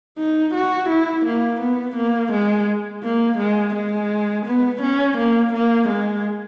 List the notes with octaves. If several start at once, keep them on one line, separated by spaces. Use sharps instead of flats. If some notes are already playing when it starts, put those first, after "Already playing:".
D#4
F#4
E4
A#3
B3
A#3
G#3
A#3
G#3
G#3
B3
C#4
A#3
A#3
G#3